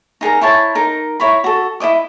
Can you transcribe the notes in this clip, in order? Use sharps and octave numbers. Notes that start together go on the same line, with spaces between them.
D#4 G#4 A#4 A#5
E4 C5 C#5 A5
D#4 A#4 A#5
E4 C#5 A#5 B5
F#4 A4
E4 C#5 D#5 D6